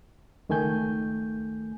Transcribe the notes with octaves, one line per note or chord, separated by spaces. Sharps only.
C#2 D#3 A3 G#5 G6